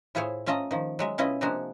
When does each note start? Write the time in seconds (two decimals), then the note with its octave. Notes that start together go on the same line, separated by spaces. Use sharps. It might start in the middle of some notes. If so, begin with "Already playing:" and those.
0.15 A2 E4 F4 G#4 C5 C#5
0.46 A3 C#4 F4 D#5 A5 A#5
0.71 D#3 F3
0.99 F#3 G#3 E5
1.18 B2 C#4 E4 F4 D#5
1.41 C3 F3 G#3 A#3 D4 F#4